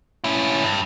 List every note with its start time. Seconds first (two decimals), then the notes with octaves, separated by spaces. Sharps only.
0.24 C#4 E4
0.64 G2